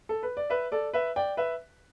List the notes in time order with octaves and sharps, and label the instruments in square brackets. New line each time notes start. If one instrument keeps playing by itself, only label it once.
[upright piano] A4
B4
D5
B4 E5
A4 D5
B4 E5
D5 G5
B4 E5